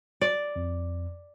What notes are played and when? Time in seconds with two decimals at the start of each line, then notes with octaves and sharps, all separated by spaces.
0.21 D5
0.56 F2